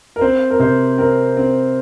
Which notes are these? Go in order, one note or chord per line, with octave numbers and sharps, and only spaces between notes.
A#4
C4 C5
A#4
C3 C5
C4 A#4
C4